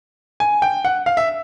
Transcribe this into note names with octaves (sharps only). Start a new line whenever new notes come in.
G#5
G5
F#5
F5
E5